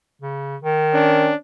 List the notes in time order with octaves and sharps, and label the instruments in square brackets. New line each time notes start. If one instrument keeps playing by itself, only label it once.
[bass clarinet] C#3
D#3
[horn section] C#4 D4